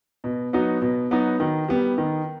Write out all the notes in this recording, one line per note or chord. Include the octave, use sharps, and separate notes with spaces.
B2
F#3 B3 D#4 F#4
B2
F#3 B3 D#4 F#4
D#3
G3 B3
D#3